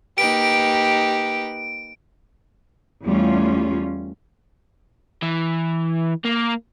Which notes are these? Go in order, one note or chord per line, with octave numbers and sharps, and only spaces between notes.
A#3 D#4 G4 B4 D7
E2 G3 A3 C#4 F4
E3
A#3